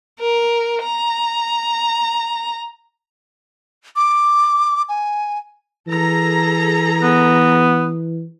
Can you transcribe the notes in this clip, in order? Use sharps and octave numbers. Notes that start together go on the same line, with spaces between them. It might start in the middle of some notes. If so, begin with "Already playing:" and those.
A#4
A#5
D6
G#5
E3 G#4 A4 A#5
B3